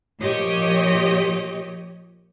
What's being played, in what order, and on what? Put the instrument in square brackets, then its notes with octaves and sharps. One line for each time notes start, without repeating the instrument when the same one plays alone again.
[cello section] A#2 F3 G4 C#5 D#5